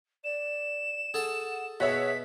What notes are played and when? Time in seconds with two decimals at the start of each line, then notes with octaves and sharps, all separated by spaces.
0.24 D5 E7
1.14 G#4 A4 F#5 A5
1.80 B2 F#4 G#4 C#5 E5 B6